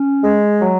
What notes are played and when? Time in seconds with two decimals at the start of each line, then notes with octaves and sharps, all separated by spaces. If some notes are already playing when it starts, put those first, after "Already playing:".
Already playing: C#4
0.23 G#3
0.60 F#3